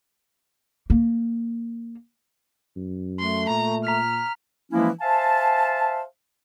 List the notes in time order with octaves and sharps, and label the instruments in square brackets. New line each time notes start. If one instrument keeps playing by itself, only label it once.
[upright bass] A#3
[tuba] F#2
[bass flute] A3 [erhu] C6
[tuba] A#2 [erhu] A#5
[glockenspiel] A#5 B6 F7 [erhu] F6
[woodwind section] E3 F3 G#3 A#3 C#4 E4
C5 E5 F5 G#5 A5